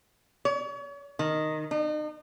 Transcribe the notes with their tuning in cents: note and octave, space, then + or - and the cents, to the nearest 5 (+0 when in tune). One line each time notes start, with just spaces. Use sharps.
C#5 +40
D#3 -5
D#4 -40